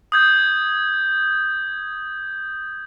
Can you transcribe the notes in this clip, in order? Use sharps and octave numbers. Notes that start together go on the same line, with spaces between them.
D#6 G6 G#6